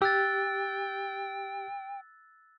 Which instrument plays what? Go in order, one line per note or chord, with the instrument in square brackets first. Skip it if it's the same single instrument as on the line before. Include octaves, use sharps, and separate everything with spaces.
[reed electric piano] G4 [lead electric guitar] G5 [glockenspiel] E6 F#6 A6